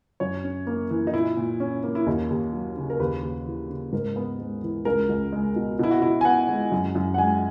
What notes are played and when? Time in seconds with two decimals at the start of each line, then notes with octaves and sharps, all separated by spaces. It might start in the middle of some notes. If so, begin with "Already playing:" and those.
0.20 F#2 C#5
0.44 C#4
0.67 A#3
0.90 E3
1.07 D#4
1.14 A#2 E4
1.37 A#2
1.60 C#4
1.83 A#3
1.95 E4
2.07 D#2 D#4
2.30 D#2
2.53 F#3
2.77 C#3
2.90 A#4
3.00 D#2 B4
3.23 D#2
3.46 E3
3.70 C#3
3.93 G#2 A#4
4.16 B3
4.39 G#3
4.63 E3
4.85 C#2 A#4
5.09 C#2
5.33 G#3
5.56 B2
5.79 B2 E4
5.91 F#4
6.02 B2 E4
6.21 G#5
6.25 B3 F#5
6.49 G#3
6.72 F#2
6.95 F#2
7.14 F#5
7.18 G#3 G#5